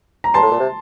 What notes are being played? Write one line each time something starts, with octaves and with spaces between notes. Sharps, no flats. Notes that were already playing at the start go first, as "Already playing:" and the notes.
A#5
G2 A5 C6
A2
A#2
C3